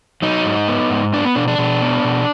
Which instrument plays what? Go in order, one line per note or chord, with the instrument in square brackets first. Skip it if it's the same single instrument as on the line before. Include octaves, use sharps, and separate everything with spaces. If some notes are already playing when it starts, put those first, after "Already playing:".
[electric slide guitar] F#3 D#4
G#2
B3
G#2
B3 D4
B3
B2 D4
D4
B2
B3
B2